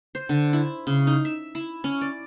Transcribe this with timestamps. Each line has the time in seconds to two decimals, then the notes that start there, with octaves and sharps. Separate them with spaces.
0.15 C5
0.29 D3
0.53 E4
0.87 C#3
1.07 D#4
1.25 E5
1.55 E4
1.84 C#4
2.01 D5